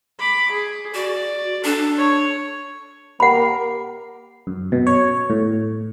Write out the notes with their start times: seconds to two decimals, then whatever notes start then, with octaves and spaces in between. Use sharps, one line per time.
0.19 B5 D6
0.51 G#4
0.94 F#4 D5
1.64 D4 A4 A5
1.98 C#5
3.20 A#3 G4 A#4 F#5 B5
4.47 F#2
4.72 B2
4.87 C#5
5.30 A2